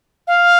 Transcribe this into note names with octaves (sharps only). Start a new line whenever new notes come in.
F5